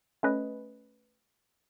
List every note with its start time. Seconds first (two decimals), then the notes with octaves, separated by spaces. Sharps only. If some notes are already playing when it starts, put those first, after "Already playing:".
0.23 A3 C#4 B4 D#5